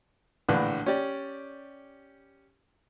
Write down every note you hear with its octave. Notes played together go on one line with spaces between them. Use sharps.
A#1 A2 D3 E3 F#6
C#4 G4 D5